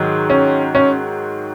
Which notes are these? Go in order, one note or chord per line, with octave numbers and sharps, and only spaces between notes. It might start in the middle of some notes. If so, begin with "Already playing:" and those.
Already playing: G#2 D#3 F#3
C#4
C#4